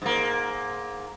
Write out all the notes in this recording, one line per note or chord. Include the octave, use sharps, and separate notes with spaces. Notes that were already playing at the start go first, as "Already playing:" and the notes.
G#2 A#3